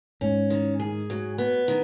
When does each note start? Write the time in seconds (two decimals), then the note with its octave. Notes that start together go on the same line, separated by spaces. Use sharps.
0.21 G#2 C#4
0.50 D#3
0.80 G#4
1.10 F#3
1.38 B3
1.68 D#3